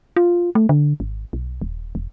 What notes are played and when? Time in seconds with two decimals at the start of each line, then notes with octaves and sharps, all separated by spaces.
0.16 F4
0.55 A3
0.69 D3
1.00 G#1
1.33 B1
1.62 D#1
1.95 E1